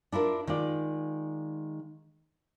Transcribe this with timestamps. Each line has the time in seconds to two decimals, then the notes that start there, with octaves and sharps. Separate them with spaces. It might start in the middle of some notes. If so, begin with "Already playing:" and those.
0.12 D4 E4 F4 A#4
0.47 D#3 G#3 F4 D5